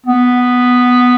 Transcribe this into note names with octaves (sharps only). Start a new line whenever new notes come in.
B3